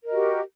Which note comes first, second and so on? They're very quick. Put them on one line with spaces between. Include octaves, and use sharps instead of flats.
A#4 D#5 F#4 G4